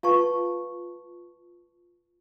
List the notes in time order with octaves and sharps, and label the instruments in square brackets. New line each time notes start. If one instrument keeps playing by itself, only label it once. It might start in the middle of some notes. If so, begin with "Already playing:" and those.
[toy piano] F4 A5 C#6 [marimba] B4 F5